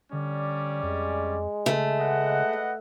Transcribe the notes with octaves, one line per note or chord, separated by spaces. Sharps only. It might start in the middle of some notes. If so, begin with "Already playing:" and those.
D3 G3 C#4 D5
F2 G#3
C#3 A3
B4 D#5 F#5